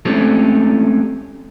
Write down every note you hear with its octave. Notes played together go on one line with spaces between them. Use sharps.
G#3 A3 C4 C#4 G4 A4